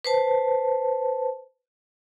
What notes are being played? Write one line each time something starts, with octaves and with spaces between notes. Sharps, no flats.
B4 C5 A5